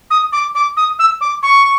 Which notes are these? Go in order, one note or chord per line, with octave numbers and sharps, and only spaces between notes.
D#6
D6
D6
D#6
E6
D6
C#6